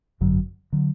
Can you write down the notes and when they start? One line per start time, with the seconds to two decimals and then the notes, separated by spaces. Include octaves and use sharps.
0.21 G#1 F#2 D3 F#3
0.73 D3 F#3